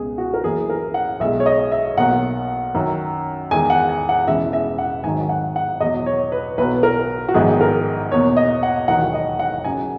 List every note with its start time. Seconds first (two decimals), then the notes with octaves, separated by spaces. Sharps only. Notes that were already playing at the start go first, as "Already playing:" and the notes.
Already playing: C#2 B2 G#3 G#4
0.18 F#4
0.34 A#4
0.44 F#2 E3 A#3 G#4
0.70 A#4
0.94 F#5
1.20 B1 B2 G#3 E5
1.40 C#5
1.46 D#5
1.72 E5
1.97 B1 B2 F#3 A#3 F#5
2.74 F#2 D#3 F#3
3.51 E2 D#3 G#3 G#5
3.70 F#5
3.89 G#5
4.09 F#5
4.27 E1 E2 C#3 E3 G#3 E5
4.53 E5
4.78 F#5
5.04 G#1 G#2 D#3 F#3 G#5
5.29 F#5
5.56 F#5
5.80 E2 B2 F#3 D#5
6.06 C#5
6.32 B4
6.58 B1 B2 F#3 B4
6.83 A#4
7.29 F#4
7.34 A#1 G#2 D#3 F#3 B3 G#4
7.61 A#4
8.12 E2 B2 A#3 C#5
8.37 D#5
8.63 F#5
8.88 E1 D#2 D#3 F#3 F#5
9.14 D#5
9.39 F#5
9.64 F#2 C#3 F#3 G#5